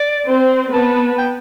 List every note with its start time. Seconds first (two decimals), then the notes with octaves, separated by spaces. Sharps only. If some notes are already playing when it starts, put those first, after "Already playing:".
Already playing: D5
0.27 C4 C5
0.73 B3 B4 A5
1.18 G5